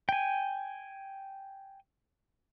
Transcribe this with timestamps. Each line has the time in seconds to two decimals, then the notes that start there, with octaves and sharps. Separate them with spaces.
0.09 G5 G#5